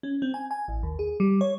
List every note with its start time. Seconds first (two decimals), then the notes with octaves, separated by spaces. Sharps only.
0.03 C#4
0.22 C4
0.34 G#5
0.51 G#5
0.68 A1
0.83 D#2
0.99 G#4
1.20 G3
1.41 C#5